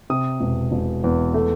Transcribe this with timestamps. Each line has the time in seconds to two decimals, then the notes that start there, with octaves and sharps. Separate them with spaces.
0.10 C3 D#6
0.40 E1
0.72 E1
1.04 E2
1.34 A3